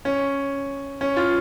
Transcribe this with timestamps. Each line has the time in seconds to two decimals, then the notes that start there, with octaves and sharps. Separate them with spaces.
0.05 C#4
1.01 C#4
1.16 F4